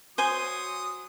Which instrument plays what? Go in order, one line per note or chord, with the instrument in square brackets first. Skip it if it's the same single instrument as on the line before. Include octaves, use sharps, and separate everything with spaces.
[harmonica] F#3 D#6 [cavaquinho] C5 G#5 C6